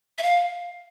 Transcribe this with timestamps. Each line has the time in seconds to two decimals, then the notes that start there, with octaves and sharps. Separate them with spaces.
0.18 E5
0.23 F5